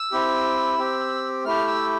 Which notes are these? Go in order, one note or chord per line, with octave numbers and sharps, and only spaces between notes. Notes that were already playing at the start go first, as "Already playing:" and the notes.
Already playing: E6
C4 E4 G4
C4 G4
A3 E4 G4 F6
E6